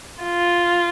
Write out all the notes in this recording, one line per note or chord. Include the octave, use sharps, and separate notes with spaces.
F4